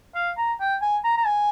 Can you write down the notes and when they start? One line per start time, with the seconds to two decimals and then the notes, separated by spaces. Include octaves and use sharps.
0.15 F5
0.37 A#5
0.60 G5
0.82 G#5
1.04 A#5
1.18 A#5
1.26 G#5